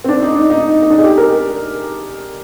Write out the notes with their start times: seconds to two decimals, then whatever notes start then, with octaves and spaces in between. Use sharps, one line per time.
0.04 C4
0.09 D4
0.23 D#4
0.36 D4
0.50 D#4
0.82 D#4
0.90 D4
0.98 G#4
1.03 G4
1.18 A#4